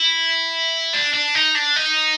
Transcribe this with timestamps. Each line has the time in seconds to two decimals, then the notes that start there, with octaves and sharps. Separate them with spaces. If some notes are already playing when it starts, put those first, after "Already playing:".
Already playing: E4
0.93 D4
1.14 D4
1.35 D#4
1.55 D4
1.76 D#4